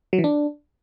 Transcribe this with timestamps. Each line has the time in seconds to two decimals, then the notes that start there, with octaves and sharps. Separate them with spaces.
0.13 F#3
0.18 E3
0.24 D4